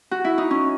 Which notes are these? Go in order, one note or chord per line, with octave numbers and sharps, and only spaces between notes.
F#4
E4
D#4
C#4